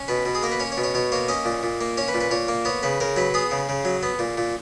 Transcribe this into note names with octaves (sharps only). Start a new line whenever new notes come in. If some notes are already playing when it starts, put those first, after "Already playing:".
Already playing: C#4
B2 B4
B2
G#4
A#3 A#4
B4
C#4 C#5
C#5
B2
C#5
B2 C#5
A#3 C#5
C#4 D#5
A#2
A#2
A#3
C#4 C#5
B4
A#2
B4
A#2 C#5
A#3
B3 C#5
C#3 B4
C#3 A#4
F#3 B4
B3 G#4
C#3
C#3
F#3
B3
A#2
A#2